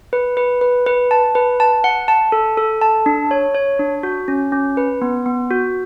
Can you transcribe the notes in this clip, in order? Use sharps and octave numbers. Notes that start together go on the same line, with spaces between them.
B4
B4
B4
B4
A5
B4
A5
F#5
A5
A4
A4
A5
D4
C#5
C#5
D4
F#4
C#4
C#4
B4
B3
B3
F#4